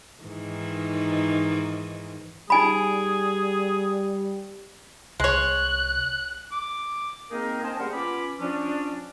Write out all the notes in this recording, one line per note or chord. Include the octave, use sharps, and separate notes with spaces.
G#2 D#3 E3
G3 D#4 G#4 G#5 B5
C2 G#3 C#5 F#6
D6
G#3 A#3 C4 D#4 G#4 A#4
C4 C#4 A#4 C5 D#5 A5
G3 A#3 G#4 A#4 C5 F#5
B3 C#4 F4 B5 D6
F3 C#4 D4